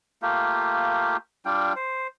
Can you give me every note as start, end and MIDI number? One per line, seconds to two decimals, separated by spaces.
0.22 1.17 57
0.22 1.17 58
0.22 1.17 65
0.22 1.17 67
1.46 1.73 55
1.46 1.73 62
1.46 1.73 65
1.46 1.73 79
1.76 2.07 72